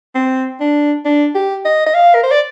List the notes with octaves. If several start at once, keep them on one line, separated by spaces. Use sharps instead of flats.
C4
D4
D4
G4
D#5
D#5
F5
A#4
C5
D5